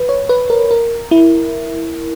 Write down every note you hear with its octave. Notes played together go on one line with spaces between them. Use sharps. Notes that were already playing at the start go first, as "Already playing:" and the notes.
Already playing: B4
C#5
B4
A#4
A#4
E4